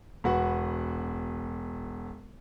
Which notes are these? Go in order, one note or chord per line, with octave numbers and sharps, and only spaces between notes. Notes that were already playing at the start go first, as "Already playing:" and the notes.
E1 B3 F#4 B4 F#5